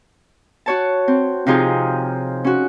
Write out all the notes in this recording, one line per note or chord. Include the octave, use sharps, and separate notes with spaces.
F#4 C#5 A5
C4
C3 F3 C4 D#4 F4 G#4
C#4 F#4